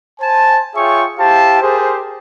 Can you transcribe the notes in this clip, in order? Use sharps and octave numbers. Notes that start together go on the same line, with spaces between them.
C5 G#5 A5
F4 G#4 C#5 E5 G5 C#6
E4 G4 C5 F5 A5
G4 G#4 A#4 C5